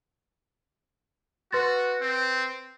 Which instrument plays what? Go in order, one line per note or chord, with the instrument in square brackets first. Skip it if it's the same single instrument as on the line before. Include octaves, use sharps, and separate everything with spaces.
[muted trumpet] F#4 [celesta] B4 C6 A6
[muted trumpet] C4